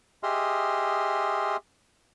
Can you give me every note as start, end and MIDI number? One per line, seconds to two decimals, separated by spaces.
0.23 1.56 67
0.23 1.56 68
0.23 1.56 75
0.23 1.56 76
0.23 1.56 84
0.23 1.56 89